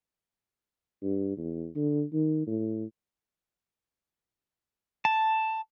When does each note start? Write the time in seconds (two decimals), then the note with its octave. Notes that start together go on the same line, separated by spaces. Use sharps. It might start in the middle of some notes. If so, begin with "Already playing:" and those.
1.02 G2
1.37 E2
1.76 D3
2.13 D#3
2.47 A2
5.05 A5